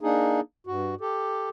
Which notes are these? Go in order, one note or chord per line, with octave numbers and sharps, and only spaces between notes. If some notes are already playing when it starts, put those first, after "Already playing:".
A#3 D4 D#4 G#4
G2 F#4
G4 A4